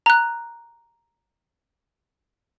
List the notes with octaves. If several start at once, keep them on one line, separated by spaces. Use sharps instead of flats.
A#5 F#6